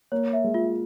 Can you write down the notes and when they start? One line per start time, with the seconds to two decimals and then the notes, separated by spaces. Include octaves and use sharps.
0.12 A#3 C#5
0.33 E5
0.44 G#3
0.54 F4